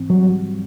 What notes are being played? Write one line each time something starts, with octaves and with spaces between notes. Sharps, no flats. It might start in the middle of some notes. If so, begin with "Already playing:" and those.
Already playing: G#2 E3 C4
F#3 G3